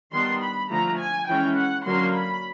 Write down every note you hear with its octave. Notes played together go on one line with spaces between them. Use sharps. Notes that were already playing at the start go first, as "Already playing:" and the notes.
D#3 G3 B3 D4 C6
B5
D3 F3 A3 A#5
G#5
E3 G#3 C#4 G5
F#5
D3 F#3 A#3 C#4 C6
B5